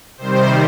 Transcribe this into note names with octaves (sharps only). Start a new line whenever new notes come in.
C3 D#3 G3 C5